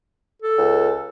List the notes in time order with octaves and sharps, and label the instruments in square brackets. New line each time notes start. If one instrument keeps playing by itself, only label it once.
[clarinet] A4
[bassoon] C#2